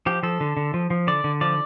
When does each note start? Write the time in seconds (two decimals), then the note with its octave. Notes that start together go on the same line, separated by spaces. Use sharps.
0.06 F3 G4
0.23 F3 A4
0.40 D3
0.57 D3
0.74 F3
0.90 F3
1.07 D3 D5
1.24 D3
1.41 F3 D5